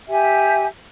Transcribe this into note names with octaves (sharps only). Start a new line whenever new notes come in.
G4 E5 G#5